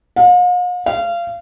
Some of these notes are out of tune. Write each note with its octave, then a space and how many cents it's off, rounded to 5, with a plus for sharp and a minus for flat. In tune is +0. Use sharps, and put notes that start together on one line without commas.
F5 +45
F5 -25